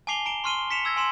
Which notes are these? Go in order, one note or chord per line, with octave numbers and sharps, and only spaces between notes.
G#5 A5 D6 C7 F7 G7
A#5 D7 E7 G7
C6 C#6 F6 C7 D#7 G7
B6 C#7 E7 F7
E6 G#6 A#6
G#5 C6 E7